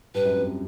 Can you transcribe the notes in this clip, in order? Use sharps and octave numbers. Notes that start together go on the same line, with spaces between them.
G2 B4
F#2
F2